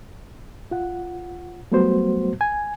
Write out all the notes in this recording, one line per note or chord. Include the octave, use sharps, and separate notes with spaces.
F4 F#5
F#3 G3 A3 B3 F#4 C5
G#5